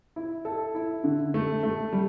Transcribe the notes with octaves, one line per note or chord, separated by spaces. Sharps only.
E4
A4
E4
D3
A3
A3
G3